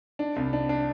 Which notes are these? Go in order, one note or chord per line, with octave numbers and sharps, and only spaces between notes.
D4
C2
D4
D4